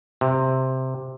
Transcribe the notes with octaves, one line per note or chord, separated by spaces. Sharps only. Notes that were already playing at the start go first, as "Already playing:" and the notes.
C3